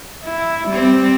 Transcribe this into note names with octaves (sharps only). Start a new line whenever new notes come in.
E4
G3 C4